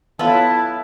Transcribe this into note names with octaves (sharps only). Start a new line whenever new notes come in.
F#3 B3 E4 F4 A4 B4 A5